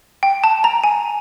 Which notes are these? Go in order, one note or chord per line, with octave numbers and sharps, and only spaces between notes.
G5
A5
A#5
G#5